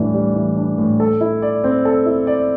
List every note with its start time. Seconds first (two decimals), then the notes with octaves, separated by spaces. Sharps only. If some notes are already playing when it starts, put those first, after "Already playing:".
Already playing: A2 E3 G3 D4
0.14 G3
0.35 E3
0.57 D4
0.78 A2
1.00 A4
1.21 E4
1.42 D5
1.64 C4
1.85 A4
2.06 E4
2.27 D5